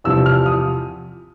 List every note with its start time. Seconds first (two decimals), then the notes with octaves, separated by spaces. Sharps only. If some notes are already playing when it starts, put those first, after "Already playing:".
0.04 E2 C3 F3 E6
0.26 F6
0.46 D#6